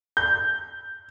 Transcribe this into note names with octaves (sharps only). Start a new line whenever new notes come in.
G6